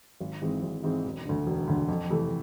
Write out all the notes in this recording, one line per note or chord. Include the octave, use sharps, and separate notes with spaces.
G#1
G#2 E3 G#3 C4
G#1
G#2 E3 G#3 C4
E1
D2 D3
E1
D2 D3
F2
C3 E3 A3